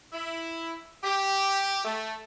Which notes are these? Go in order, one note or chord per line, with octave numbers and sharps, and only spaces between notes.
E4
G4
A3